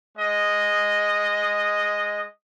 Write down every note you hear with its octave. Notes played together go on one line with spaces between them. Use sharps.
G#3 D#5